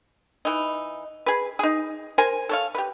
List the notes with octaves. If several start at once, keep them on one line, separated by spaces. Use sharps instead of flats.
E3 D#4
G#4 B4
D#4 G#4
A#4 C5 G#5
A4 C#5 F5
G4 B4